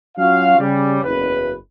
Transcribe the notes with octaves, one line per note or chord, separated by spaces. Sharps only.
F#3 C#4 F4 F#4 F5
C#3 G3
F#1 E2 B4